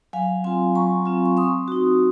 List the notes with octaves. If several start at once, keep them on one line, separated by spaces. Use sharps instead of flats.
F#3 F5 G#5
C4 F4 G#5 C6
F#3 A#5 C#6
C4 F4
C#6
C4 C6 D#6
D#4 F#4